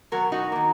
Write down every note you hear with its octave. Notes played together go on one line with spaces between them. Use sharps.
B2 F#3 A#3 F#4 A#4
D#4 F#4
D#3 A#3